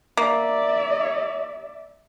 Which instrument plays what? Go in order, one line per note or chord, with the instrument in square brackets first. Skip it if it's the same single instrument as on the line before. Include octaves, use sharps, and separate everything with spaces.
[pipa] A#3 [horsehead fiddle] D5 E5